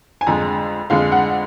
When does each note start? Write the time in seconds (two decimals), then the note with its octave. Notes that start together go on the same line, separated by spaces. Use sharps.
0.21 G#5
0.27 F2 D3 G#3 A#5
0.90 F2 D3 G#3 F5
1.12 F#5